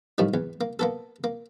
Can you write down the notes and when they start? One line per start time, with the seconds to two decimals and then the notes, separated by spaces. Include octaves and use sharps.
0.18 A2 D#3 F3 G3
0.34 E2
0.61 A#3
0.79 A#3 B3 A4
1.24 A#3